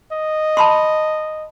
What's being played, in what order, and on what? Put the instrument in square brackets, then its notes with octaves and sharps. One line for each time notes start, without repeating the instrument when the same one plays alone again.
[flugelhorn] D#5
[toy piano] A5 B5 C6